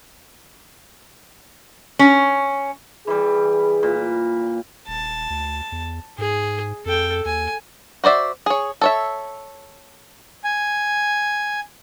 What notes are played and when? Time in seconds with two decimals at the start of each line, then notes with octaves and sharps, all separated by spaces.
1.99 C#4
3.07 E3 G3 G#4
3.83 A#2
4.88 D#1 A5
5.30 D2
5.72 E2
6.18 G#2 G#4
6.85 F2 A4 G5
7.25 D#2 G#5
8.04 F#4 C5 D5 E5
8.46 G#4 C#5
8.81 A4 C#5 E5
10.44 G#5